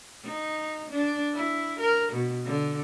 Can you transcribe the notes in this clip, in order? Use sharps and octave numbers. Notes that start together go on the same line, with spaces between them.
D#4
D4
E4
A#4
B2
D3